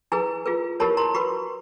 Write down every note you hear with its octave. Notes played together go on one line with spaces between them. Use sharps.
E4 G#4 B4 G#5 A#5
F4 G#4 B4
E4 G4 A#4 C#5 A5 B5
A#5 C6
F#4 B4 B5 C#6